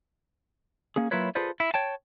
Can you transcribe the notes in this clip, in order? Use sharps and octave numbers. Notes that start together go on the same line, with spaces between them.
A#3 C#4 G#4
F#3 A#3 E4 F4 B4 C#5
F4 G#4 A4 B4 C5 D5
E4 E5
C#5 G5 A5